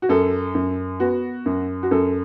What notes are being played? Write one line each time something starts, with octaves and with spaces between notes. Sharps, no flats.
F#4
F#2 A4
F#2
B3 F#4
F#2
F#4
F#2 A4